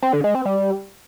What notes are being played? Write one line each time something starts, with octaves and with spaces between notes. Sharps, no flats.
C4
D3
G#3
C4
G3